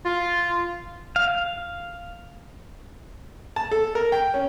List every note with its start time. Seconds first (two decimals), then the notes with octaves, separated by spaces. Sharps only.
0.05 F4
1.16 F5
3.56 A5
3.71 A4
3.95 A#4
4.12 G5
4.34 C#4